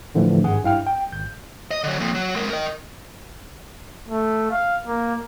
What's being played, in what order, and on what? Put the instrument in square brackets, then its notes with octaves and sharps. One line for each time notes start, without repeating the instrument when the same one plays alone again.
[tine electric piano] A2 D3 E3 F3 A3 D4
G#1 G2 G#4 F#5
G2 E4 F5 G5 F6
G5
G#1 G6
[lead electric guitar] D#5
D3 F#3
F2 A#2
F#3
G#3 A#4
A#4 D#5
[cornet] A3
F5
A#3